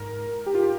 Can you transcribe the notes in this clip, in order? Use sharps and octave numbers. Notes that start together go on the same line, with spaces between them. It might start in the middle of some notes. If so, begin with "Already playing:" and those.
Already playing: G#2 A#4
G#2
G#2 G4
F4
G4